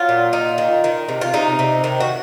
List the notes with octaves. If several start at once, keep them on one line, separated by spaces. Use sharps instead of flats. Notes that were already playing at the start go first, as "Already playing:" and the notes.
Already playing: F#3 F4
A#2
D#4
D#3
D#3
C3
F4
C3 D#4
C3
D#3
F#4